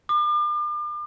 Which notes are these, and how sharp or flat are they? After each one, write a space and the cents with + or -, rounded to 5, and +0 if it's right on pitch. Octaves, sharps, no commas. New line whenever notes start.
D6 +40